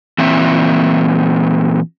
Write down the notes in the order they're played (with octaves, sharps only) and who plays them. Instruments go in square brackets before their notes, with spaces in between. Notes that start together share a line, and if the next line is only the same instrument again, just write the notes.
[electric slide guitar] A#2 E3 C4 E5